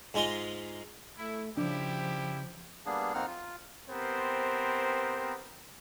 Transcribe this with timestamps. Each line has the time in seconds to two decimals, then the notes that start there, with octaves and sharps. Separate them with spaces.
0.14 G#2 G#3 F4 D#5 C6
1.17 A3 E4
1.57 C#3 F3 G3 D4 E4 G4
2.86 G3 A#3 B3 D4 G#4
3.14 F2 A#3 C4 D#4 F#5 F6
3.27 F4
3.89 B3 C4 G4 A#4 C5